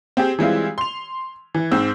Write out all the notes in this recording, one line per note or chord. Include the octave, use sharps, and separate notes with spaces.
C4 G4 G#4
E3 G3 G#3 C4 E4 F4
C6 F7
E3
G#2 C4 E6